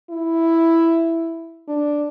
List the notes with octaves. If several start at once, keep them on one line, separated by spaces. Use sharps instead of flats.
E4
D4